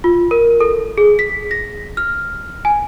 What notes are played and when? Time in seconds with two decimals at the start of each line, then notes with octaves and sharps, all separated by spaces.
0.04 F4
0.31 A#4
0.61 A4
0.98 G#4
1.19 B6
1.51 A#6
1.97 F6
2.65 G#5